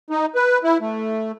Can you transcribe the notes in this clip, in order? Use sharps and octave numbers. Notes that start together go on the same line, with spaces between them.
D#4
B4
E4
A3